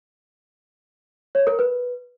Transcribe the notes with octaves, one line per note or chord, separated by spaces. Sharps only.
C#5
A#4
B4